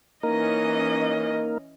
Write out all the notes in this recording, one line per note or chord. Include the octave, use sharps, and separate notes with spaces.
E3 A#3 C#4 D#4 A#4 D#5